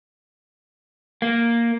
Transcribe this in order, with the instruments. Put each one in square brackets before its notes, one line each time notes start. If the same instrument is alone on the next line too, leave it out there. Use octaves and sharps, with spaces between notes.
[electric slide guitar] A#3